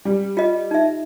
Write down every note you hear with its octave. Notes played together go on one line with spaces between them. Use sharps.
G3
F4 D#5
D#4 E5